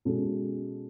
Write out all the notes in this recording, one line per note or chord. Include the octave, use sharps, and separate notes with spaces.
B2 G#3 C#4 F#4 A4